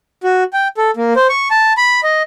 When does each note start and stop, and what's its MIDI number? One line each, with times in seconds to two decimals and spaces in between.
0.23 0.44 66
0.53 0.68 79
0.77 0.91 69
0.97 1.13 58
1.16 1.27 72
1.29 1.48 85
1.51 1.73 81
1.77 2.01 83
2.03 2.22 75